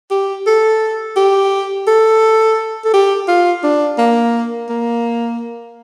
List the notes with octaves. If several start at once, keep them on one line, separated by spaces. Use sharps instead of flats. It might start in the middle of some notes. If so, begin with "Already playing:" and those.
G4
A4
G4
A4
A4
G4
F4
D4
A#3
A#3